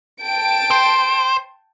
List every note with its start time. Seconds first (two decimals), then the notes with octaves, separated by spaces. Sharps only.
0.22 G5 A5 D7
0.71 C5